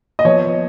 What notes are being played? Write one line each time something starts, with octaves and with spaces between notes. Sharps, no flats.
D#5
F3 B3 C#5